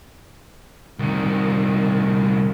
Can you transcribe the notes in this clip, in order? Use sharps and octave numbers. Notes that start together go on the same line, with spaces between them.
C2 D#3